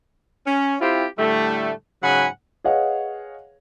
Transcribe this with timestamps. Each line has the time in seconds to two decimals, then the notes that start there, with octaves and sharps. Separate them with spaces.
0.47 C#4
0.81 C4 E4 F4 G4 C5
1.19 A2 D3 G3 A3
2.03 G#2 C#3 F#3 F#5 G#5 B5
2.64 G#4 B4 C#5 D#5 F5 F#5